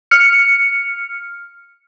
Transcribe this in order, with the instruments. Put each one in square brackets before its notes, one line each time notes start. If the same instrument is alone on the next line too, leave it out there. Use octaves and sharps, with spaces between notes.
[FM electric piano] F6 C#7